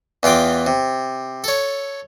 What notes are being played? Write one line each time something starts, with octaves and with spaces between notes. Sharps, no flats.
E2 E3 F4 G5 D6
C3
A4 C#5